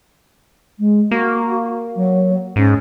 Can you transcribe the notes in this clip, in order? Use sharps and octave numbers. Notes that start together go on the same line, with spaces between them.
G#3
A#3 F#4
F#3
G#2 C#4